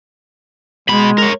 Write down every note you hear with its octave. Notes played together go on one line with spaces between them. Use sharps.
B2 G#3 B5
A#4 C#5